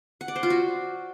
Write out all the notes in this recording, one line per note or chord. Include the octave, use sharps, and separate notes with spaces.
F#5
D5
C5
F4
F#4